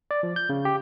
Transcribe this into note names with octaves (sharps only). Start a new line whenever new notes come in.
D5
F3
G6
C#3
G4